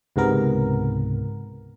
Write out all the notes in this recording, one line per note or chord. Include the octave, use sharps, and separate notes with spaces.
C#2 G#2 C3 B3 A#4